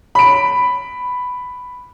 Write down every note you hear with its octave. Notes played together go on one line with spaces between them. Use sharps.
B5 D7